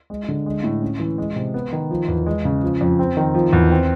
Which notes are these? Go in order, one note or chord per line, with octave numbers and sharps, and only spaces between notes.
G#3
D3
G#3
A2
C#4
E3
G#3
C3
B3
D#3
F3
E2
G#3
C#3
F3
F2
C4
D#3
F3
E2
C4